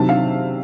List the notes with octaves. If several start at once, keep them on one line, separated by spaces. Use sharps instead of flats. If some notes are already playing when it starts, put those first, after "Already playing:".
Already playing: C3 D#3 F#3 A5
F5